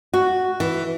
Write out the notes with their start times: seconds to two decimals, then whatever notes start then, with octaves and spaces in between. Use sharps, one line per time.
0.14 F#4
0.60 E3